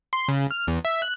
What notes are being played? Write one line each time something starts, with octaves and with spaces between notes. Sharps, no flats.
C6
C#3
F6
E2
E5
F#6